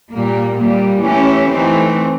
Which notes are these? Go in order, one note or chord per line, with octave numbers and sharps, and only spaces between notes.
A#2 G3 A#3
A#2 G3 A#3
E3 A3 C#4 E4 G4
E3 A3 C4 D#4